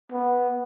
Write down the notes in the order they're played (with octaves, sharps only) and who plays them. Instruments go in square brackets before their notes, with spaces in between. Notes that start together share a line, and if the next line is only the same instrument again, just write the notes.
[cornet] B3